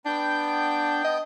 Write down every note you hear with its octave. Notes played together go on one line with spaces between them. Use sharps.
B3 D4 G5 G6
D#5